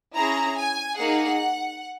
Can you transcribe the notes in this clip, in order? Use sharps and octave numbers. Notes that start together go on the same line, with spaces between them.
C#4 E4 G#4 A#5
G#5
A#3 D#4 G#4 F#5